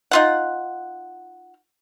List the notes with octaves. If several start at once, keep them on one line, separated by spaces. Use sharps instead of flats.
D#4 F4 F#5